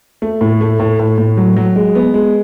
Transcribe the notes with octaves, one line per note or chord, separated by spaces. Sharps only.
A3
A2
A3
A2
A2
A2
F#3
F#3
G#3
B3
G#3